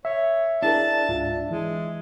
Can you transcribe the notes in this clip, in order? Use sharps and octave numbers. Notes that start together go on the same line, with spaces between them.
C#5 E5
D4 E4 G#4 A#4 A5
C#2 G#2 F4
E3 G#3